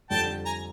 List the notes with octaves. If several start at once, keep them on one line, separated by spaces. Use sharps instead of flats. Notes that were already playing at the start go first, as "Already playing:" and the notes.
F2 D3 G3 G5 A5
G#5 A#5